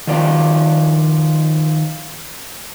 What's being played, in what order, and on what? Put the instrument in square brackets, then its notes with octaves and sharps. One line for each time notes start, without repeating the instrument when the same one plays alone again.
[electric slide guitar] D#3 F3 F4 D5